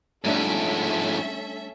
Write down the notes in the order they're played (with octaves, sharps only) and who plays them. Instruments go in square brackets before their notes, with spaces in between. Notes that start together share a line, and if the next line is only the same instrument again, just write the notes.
[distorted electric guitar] F2 G#2 [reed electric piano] G3 A3 D4 [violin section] C#4 A4 E5